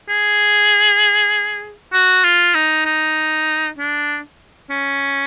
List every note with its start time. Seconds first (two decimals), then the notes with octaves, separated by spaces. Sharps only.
0.09 G#4
1.93 F#4
2.24 F4
2.54 D#4
2.85 D#4
3.78 D4
4.70 C#4